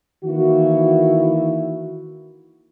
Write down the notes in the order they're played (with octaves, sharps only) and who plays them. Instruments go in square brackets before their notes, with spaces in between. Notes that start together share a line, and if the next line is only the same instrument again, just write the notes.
[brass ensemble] D#3 E3 A#3 E4 F#4